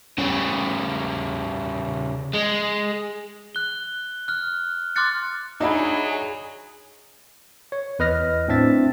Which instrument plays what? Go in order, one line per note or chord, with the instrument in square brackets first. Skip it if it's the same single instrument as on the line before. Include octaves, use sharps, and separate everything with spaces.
[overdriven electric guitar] C#3 G3
G#3
[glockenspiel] F#6 G7
F6 F#6
C6 D6 F6 F#6 A6 C#7
[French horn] F#3 [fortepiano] D4 D#4 E5 [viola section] G#4 [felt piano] D#5 A#5 B5
[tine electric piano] C#5
E2 B4 D#5 F6 A#6
A2 C4 D4 E5 A6